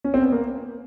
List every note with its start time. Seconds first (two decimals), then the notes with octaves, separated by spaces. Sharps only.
0.04 C#4
0.14 C4
0.23 B3
0.32 A#3